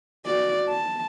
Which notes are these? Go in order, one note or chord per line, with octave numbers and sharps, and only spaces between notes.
F#4 D5
A5